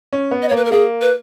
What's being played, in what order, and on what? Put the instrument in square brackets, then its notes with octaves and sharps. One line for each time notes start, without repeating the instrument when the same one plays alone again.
[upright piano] C#4
B3
[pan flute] D#5
C#5
[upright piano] A#3
[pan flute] B4
A#4
[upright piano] A#3 [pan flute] G#4
[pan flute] B4